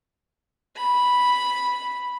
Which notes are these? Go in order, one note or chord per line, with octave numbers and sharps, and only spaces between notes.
B5